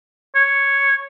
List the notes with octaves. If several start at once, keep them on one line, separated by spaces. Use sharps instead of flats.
C#5